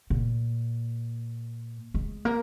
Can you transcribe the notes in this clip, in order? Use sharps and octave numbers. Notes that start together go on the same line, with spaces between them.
A#2
G#3
A#3